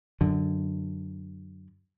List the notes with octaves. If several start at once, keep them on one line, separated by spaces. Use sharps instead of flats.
F#2 D3